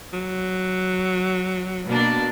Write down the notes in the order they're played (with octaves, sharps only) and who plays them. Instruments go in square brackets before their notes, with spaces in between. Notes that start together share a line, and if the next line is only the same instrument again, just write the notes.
[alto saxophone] F#3
[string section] B2 A#3 D4